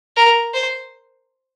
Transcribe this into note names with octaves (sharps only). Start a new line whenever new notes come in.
A#4
C5